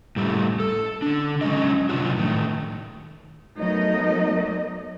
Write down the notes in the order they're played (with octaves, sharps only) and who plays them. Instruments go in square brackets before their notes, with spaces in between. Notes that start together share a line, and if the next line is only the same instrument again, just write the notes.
[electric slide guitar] A2 G3 A3
A4
D3 D4
F#3 G#3 C#4 D#4 G4 D#5
C3 F#3 D4 F4 F#4
A2 D#3 A3
[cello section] F#3 A3 B3 D#4 A#4 D#5